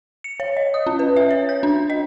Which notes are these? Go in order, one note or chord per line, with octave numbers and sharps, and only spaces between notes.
C#7
C#5
D#5
D#6
C#4
B4
E5
C#5
G6
D4
D#5